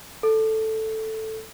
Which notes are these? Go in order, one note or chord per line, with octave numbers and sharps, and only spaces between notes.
A4